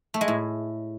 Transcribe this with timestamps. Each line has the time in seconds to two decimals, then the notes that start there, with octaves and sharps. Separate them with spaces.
0.14 A3
0.21 G#3
0.28 A2